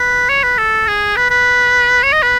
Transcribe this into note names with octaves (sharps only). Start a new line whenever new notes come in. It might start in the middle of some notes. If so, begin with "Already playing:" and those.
Already playing: B4
C#5
B4
A4
G#4
B4
B4
C#5
D#5
B4